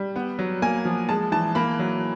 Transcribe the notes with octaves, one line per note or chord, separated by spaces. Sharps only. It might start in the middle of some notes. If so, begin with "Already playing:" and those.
Already playing: G3
B3
F#3
A#3 G#5
F3
G#3 A5
E3 A5
A#3 B5
F#3